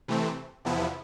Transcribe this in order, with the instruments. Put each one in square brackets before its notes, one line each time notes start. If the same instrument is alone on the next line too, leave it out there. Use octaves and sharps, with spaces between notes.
[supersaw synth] C3 E3 A3 C4
E2 C3 F3 B3 E4